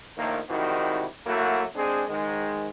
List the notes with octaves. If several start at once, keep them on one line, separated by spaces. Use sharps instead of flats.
A#1 A2 D#3 A3 A#3
G#2 C3 D#3 G3 E4 F#4
F#3 A3 A#3 E4 F#4
G#3 C4 D4 G#4
G#2 D#3 G#3